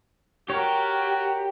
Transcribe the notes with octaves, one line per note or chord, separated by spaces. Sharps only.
F#4 G4 A#4 C#5